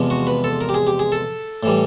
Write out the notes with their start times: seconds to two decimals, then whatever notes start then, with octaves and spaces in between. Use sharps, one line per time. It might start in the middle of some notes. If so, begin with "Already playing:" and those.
Already playing: E2 C3 F3 G#3 B3
0.10 F#4
0.27 B4
0.44 A4
0.61 A#4
0.69 G4
0.74 G#4
0.87 G4
0.99 G#4
1.12 A4
1.63 A2 E3 G3